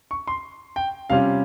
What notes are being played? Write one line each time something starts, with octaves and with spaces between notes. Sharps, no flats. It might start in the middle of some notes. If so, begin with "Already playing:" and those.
C#6
C6
G5
C3 G3 C#4 F4 F5